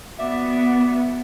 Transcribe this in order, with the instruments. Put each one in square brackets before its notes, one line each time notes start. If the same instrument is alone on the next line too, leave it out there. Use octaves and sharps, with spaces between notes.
[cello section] B3 [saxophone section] F#4 D5 E5